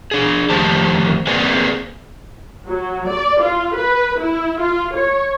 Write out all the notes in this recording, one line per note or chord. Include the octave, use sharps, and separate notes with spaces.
D4 G#4
F2 D#3 A3 G4 C5 A5
A#3 C4 G#4 B4 D5 G#5
F#3
D5
F4
B4
E4
F4
C#5